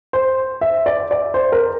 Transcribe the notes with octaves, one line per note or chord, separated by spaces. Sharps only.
C5
E5
D5
D5
C5
A#4